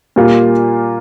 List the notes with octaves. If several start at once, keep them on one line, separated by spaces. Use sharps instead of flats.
A#2 G3 A#3 F4